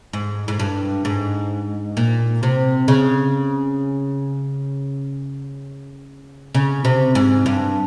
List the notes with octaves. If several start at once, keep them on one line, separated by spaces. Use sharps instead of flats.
G#2
G#2
G2
G#2
A#2
C3
C#3
C#3
C3
G#2
G2